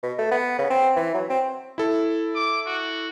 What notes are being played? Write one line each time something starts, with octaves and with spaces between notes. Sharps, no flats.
B2
A3
B3
C#3
C4
E3
F#3
C4
E4 A4
D6
F#4